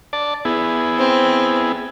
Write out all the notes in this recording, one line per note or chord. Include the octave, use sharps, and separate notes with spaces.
D5 A5
B3 E4 G#4
C4